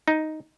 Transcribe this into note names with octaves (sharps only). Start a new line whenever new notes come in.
D#4